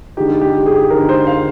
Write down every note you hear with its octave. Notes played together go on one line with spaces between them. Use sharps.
D3 G#3 D#4 G4
G4
G#4
D3 G#3 D#4 A#4
C5
F5